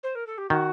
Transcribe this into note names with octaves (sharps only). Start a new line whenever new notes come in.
C5
A#4
A4
G4
D#3 F#4